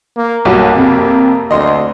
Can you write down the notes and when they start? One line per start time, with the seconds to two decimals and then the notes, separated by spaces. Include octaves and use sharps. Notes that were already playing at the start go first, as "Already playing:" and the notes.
0.16 A#3
0.45 B1 G2 A#3 F#4
0.76 F2 C3
1.51 D2 D#5 C6